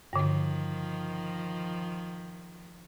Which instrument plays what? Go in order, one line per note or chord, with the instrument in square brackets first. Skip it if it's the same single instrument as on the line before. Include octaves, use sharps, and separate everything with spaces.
[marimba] G2 D3 [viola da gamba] D#3 F3